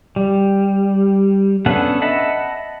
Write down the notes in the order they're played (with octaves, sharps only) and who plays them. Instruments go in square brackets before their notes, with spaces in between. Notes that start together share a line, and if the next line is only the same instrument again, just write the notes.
[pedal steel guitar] G3
B3 C#4 D4 A4 F#5
D#5 E5 F#5 A5 B5